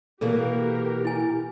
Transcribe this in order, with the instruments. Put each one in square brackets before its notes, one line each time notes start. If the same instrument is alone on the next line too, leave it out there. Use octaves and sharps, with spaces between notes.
[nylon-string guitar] B2 E3 A#3 [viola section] G4 A#4 [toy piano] A4
[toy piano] E4 G#5